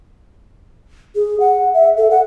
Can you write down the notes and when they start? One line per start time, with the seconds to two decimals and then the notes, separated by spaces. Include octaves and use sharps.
1.15 G#4
1.40 F#5
1.74 E5
1.97 A4
2.10 F#5